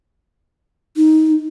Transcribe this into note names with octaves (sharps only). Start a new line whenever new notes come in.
D#4